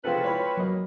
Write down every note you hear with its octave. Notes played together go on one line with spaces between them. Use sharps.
C3 F3 G#3 C4 C#4 F4 A4 B4
E4 F4 C#5 B5
F#3 A#3 D#5